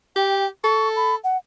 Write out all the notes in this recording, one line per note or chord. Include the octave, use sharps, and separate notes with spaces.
G4 G5
A4 C#6
B5
F#5